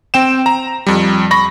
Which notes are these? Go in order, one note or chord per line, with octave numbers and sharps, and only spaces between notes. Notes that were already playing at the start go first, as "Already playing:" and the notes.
C4 G5 E7
A#5
F2 G3
B5 C#6 A#6